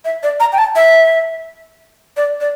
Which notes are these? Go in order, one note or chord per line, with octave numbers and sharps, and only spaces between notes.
E5
D5
A#5
G5
A5
E5
D5
D5